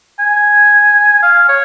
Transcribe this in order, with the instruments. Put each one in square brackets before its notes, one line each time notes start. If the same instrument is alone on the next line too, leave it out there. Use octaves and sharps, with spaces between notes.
[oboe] G#5
F5
C#5